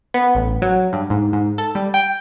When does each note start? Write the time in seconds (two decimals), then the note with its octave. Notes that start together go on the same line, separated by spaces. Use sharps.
0.14 B3
0.35 A1
0.62 F#3
0.93 G2
1.10 G#2
1.33 G#2
1.58 A4
1.75 G3
1.94 G5